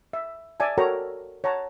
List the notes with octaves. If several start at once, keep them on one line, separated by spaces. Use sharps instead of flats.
E5
D5 E5 G#5 A5
F#4 A4 A#4 C#5 G5 A#5
C#5 F#5 A5 A#5